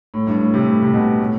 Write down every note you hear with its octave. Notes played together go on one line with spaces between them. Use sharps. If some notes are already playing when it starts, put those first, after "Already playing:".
A2
G2
A2
C3
A2
C3
B2
A2